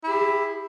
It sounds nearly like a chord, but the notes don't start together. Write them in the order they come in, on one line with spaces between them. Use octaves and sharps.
E4 G#4 G4